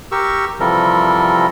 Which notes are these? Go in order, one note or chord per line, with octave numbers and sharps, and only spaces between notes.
G4 A#4 C#6 E6
C3 E3 F3 G3 A4 A#4